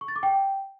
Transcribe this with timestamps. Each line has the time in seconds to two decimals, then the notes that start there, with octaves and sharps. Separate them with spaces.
0.01 C#6
0.08 A6
0.16 D6
0.23 G5